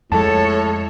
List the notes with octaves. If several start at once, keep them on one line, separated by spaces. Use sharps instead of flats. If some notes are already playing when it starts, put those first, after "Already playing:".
F2 A2 G#3 A4 C#5 A5